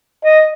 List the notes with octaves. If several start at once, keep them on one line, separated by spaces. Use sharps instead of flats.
D#5